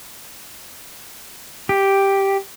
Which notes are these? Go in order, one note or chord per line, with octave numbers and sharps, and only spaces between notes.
G4